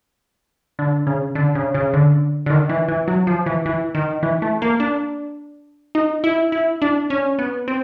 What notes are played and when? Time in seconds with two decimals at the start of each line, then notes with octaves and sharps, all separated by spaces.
0.79 D3
1.07 C#3
1.35 D3
1.55 C#3
1.75 C#3
1.94 D3
2.46 D3
2.50 D#3
2.69 E3
2.88 E3
3.08 F#3
3.27 F3
3.46 E3
3.66 E3
3.95 D#3
4.23 E3
4.42 A3
4.62 A#3
4.80 D4
5.95 D#4
6.24 E4
6.52 E4
6.82 D4
7.10 C#4
7.39 B3
7.68 C4